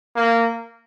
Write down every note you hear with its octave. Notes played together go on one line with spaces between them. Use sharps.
A#3